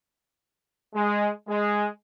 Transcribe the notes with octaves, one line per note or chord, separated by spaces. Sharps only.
G#3
G#3